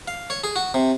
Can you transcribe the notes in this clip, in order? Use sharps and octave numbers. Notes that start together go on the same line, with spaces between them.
F5
C#5
G#4
F#4
C3